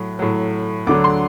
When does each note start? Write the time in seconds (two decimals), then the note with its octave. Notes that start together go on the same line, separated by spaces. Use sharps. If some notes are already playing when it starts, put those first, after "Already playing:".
Already playing: A2 F#3
0.19 A2 F#3
0.87 D2 D3 F#3 D6
1.04 C6